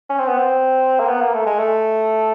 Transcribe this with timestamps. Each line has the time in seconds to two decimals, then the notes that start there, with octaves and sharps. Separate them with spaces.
0.10 C#4
0.19 C4
0.28 B3
0.38 C4
1.00 A#3
1.09 B3
1.22 A#3
1.34 A3
1.46 G#3
1.59 A3